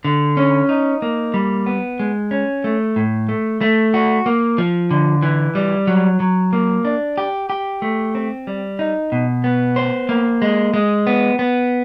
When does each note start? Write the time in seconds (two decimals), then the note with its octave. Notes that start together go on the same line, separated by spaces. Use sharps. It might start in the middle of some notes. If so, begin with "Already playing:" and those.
0.05 D3
0.37 C#4
0.69 D#4
1.02 A#3
1.34 G3
1.66 B3
2.00 G#3
2.31 C#4
2.64 A3
2.96 A2
3.29 A3
3.61 A3
3.94 F#4
4.26 A#3
4.58 F3
4.91 D3
5.23 E3
5.55 G3
5.87 F#3
6.20 F#3
6.53 A#3
6.85 D4
7.18 G4
7.50 G4
7.82 A3
8.15 C4
8.47 G3
8.79 D#4
9.12 B2
9.44 B3
9.76 C5
10.09 A#3
10.42 G#3
10.74 G#3
11.07 B3
11.39 B3